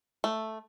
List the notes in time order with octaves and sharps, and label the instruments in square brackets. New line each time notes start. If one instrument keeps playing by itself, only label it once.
[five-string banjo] A3